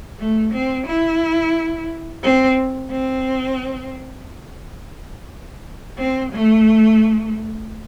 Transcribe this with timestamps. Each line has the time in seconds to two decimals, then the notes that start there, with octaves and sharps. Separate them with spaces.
0.19 A3
0.53 C4
0.87 E4
2.23 C4
2.91 C4
5.98 C4
6.32 A3